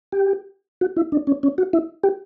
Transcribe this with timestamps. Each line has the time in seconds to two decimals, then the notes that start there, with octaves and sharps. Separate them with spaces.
0.12 G4
0.81 F#4
0.96 E4
1.12 D4
1.27 C#4
1.43 C#4
1.58 F#4
1.73 E4
2.04 G4